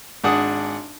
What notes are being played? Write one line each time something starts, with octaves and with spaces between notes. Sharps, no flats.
G#1 D4 G#4 F#5 D#6